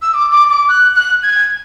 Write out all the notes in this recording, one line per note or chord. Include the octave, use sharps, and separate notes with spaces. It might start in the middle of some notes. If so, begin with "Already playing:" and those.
E6
D6
D6
D6
F#6
F#6
G#6